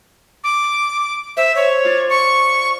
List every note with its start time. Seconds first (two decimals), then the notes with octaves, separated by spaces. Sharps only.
0.44 D6
1.37 C5 E5
1.56 C#5
1.85 F4 D5
2.10 C#6